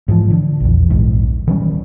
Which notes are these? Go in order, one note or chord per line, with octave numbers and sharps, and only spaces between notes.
G#2 E3 F3
D3
A#1 E2
A#1 D#2 G#2 D#3
D#3 F#3 G3 C#4